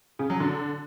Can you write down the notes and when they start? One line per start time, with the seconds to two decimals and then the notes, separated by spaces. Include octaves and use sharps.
0.19 C#3
0.30 F#3
0.40 D3